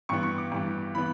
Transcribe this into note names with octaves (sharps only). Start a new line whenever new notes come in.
G2 E3 B3 C#6
C#6
D6
G2 E3 B3
E3 B3 B5